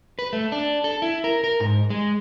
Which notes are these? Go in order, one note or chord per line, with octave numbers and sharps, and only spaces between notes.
B4
A3
D4
A4
E4
A#4
A#4
G#2
G#3